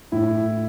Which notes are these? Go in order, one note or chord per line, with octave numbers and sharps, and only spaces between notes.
A2 E4